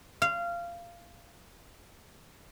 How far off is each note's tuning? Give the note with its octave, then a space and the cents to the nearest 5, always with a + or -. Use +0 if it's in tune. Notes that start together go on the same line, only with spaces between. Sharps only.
F5 -20